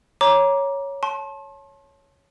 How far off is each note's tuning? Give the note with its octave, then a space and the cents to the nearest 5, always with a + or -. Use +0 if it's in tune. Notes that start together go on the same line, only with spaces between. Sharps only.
C#5 +0 A#5 +20 D6 -5
A5 -20 C6 +40